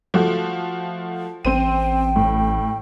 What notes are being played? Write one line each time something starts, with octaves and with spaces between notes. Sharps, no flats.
F3 A3 F#4
A1 C4 C5 G5 D#7
A2